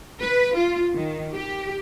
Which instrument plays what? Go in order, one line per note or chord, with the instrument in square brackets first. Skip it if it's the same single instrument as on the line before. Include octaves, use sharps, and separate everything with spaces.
[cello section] B4
F4
D#3
G4